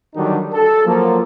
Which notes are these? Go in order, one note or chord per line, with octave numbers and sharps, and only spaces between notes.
D3 D#3 F#3 G3 D4 D#4
A4
F3 F#3 A#3